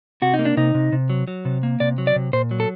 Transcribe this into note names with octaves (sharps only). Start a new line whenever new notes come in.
C3 F#4
D#4
A#3
D4
C3 D#4
C3
C3
F#3
F#3
C3
A#3
C3 D5
F#3
D5
C3
A#2 C5
F#3
A4